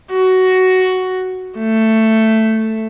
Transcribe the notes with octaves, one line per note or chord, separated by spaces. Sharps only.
F#4
A3